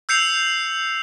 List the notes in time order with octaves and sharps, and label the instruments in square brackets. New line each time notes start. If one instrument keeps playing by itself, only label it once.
[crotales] E6 G6 C7 C#7 F7